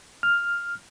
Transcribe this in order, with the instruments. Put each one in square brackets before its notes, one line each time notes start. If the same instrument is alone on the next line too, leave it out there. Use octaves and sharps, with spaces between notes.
[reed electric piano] F6